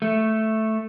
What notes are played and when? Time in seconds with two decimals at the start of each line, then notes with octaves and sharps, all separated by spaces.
0.02 A3